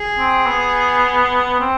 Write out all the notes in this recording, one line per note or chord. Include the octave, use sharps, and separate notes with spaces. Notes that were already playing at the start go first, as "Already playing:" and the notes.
Already playing: G#4
C4
B3
C4